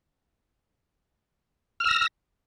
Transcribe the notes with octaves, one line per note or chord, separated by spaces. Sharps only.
E6 F6 A#6